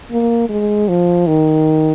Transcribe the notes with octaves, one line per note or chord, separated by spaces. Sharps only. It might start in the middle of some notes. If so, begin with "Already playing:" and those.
A#3
G#3
F3
D#3